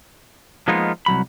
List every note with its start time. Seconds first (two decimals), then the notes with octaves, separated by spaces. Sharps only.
0.68 F3 G#3 A#3 B3 D#4 F4
1.06 C2 F#3 B5